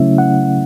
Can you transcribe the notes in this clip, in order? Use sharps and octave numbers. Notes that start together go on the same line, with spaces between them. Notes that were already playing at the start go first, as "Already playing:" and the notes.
Already playing: C#3 F#3 A3 C#4 E4 E5
F#5